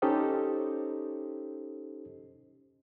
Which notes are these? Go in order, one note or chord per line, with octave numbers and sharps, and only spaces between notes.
C#4 D#4 G4 A4 C5 D#5